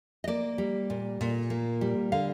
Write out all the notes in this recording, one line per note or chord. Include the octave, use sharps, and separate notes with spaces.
D#5
A#3 D5
G3
A#2
A#2
A#3
G3
D3 F5